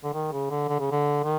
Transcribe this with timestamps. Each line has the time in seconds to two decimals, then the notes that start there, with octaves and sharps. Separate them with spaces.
0.04 D3
0.14 D#3
0.32 C#3
0.50 D3
0.68 D3
0.80 C#3
0.91 D3
1.23 D#3